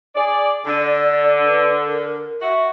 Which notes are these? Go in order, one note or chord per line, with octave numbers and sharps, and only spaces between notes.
G#4 D5
D3 D5
B4
A#4
F#4 E5